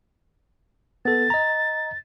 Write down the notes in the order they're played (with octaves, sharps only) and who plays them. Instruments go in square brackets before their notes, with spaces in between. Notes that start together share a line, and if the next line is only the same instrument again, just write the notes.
[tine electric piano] B3 A4 [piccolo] A6
[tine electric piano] D#5 A#5